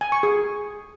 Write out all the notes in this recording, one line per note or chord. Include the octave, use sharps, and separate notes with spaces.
G#5
C#6
G#4